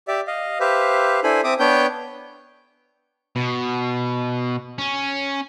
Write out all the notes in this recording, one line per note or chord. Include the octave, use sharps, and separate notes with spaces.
G4 D5 E5
D#5 F5
G4 B4 C5 E5 F5
D4 E4 A4 C5 G#5 B5
C4 E5 D6 D#6
B3 D4 B4 C#5 G5 G6
B2
C#4